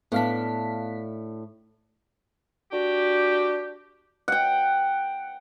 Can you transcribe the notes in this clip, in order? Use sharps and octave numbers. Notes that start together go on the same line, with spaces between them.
A2 B3 D4 F5 B6
D4 F#4 G4
F#5 G5